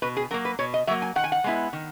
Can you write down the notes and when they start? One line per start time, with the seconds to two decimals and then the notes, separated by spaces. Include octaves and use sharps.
0.02 B2 B4
0.17 G#4
0.31 F#3 A#4
0.34 A#3
0.45 B4
0.59 B2 C#5
0.74 D#5
0.87 F#3 A#3 E5
1.02 G#5
1.16 D#3 F#5
1.24 G#5
1.32 F#5
1.44 G#3 B3 E4
1.73 D#3